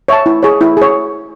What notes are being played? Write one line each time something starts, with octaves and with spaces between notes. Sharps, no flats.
C#5 E5 A5
E4
G#4 C#5
E4
G#4 C#5